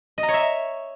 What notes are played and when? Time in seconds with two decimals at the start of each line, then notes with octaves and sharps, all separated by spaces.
0.18 D#5
0.23 A#5
0.28 C#5
0.34 E5